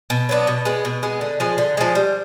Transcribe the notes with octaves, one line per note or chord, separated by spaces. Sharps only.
B2
F#3 B3 D4
B2
G#3 B3
B2
G#3 B3
D3
F3 G#3
D3
F3 G#3
G3